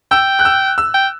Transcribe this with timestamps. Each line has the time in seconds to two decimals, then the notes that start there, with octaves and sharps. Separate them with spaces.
0.11 G5 E6
0.39 F#6
0.45 E6
0.78 E6
0.94 G5